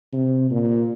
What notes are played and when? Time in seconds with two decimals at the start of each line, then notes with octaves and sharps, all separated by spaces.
0.13 C3
0.51 A#2